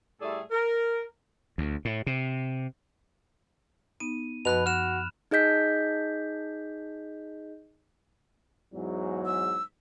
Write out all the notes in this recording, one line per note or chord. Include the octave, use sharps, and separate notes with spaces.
A2 G3 A3 G#4 A4 D5
A#4
D2
A2
C3
B3 D#4 D#7
F#2 B2 F3 B5 F#6 F7
F#4 F6 F#6 E7
D#4 G#4 D#5 G6 B6
E2 G#2 F#3
E6